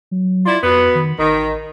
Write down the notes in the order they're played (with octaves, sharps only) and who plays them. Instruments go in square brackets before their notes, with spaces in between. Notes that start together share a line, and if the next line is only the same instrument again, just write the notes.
[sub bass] F#3
[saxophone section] E4 F4 D5
[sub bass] F2 [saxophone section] F#3 B3
[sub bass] D#3
[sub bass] A1 [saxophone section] D#3